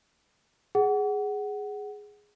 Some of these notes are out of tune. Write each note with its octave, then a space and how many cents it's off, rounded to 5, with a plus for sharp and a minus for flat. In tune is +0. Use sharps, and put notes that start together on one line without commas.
G#4 +0 F#5 +15